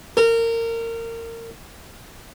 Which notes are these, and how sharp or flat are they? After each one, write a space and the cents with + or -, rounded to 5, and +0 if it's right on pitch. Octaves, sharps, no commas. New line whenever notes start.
A#4 -25